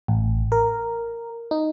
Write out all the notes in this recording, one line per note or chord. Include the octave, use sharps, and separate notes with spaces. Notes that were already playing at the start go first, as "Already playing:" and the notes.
A1
A#4
D#4